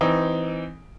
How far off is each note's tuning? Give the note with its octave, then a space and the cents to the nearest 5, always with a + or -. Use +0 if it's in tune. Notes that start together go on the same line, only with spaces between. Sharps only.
E3 +0 C4 -15 D#4 +0